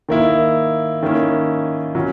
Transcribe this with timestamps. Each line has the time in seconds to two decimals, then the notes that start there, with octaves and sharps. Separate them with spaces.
0.09 D#3 A#3 E4
1.03 D#3 A#3 C#4 E4
1.95 F#3 C#4